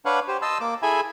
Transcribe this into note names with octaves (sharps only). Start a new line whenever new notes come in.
D4 B4 C#5 F5 F#5
G4 C5
D#5 A5 C6 E6
A#3 D6
E4 G#4 A4 E5 G#5 B5